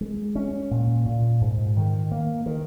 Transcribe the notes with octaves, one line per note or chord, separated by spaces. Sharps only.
G#3
C#4
A#2
A#2
G#2
D#3
A#3
D#3